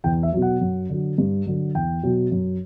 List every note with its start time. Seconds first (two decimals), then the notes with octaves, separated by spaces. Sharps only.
0.04 E2 G5
0.23 E5
0.33 B2 F#3
0.42 F#5
0.61 F#2
0.90 D3 F#3
1.18 G2
1.46 D3 F#3
1.75 E2 G5
2.03 B2 F#3
2.32 F#2